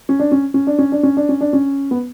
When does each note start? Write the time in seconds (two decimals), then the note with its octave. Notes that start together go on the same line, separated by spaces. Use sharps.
0.09 C#4
0.19 D4
0.32 C#4
0.54 C#4
0.67 D4
0.78 C#4
0.92 D4
1.03 C#4
1.17 D4
1.29 C#4
1.41 D4
1.53 C#4
1.91 B3